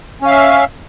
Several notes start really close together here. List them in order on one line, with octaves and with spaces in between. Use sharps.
C#4 F5 E5